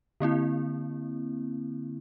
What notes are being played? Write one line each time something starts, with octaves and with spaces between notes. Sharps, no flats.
D3 A#3 C4 E4